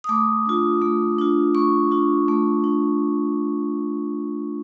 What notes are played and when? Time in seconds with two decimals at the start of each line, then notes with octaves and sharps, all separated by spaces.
0.04 D#6
0.09 A3 D6
0.46 D4 F4
0.82 A3
1.18 D4 F4
1.55 A3 C#6
1.91 D4 F4
2.28 A3
2.64 D4